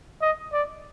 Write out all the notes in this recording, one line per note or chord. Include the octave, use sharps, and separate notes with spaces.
D#5
D5